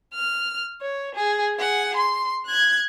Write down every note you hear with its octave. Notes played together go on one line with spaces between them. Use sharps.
F6
C#5
G#4
G#4 F#5
C6
F#6 G#6